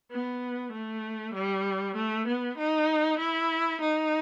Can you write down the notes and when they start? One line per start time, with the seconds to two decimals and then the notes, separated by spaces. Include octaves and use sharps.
0.11 B3
0.72 A3
1.35 G3
1.96 A3
2.27 B3
2.58 D#4
3.19 E4
3.81 D#4